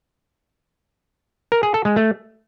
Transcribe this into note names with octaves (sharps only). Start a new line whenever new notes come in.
A#4
G#4
A4
G#3
A3